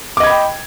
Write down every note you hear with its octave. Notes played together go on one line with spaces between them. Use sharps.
D#5 G5 B5 D6 G#6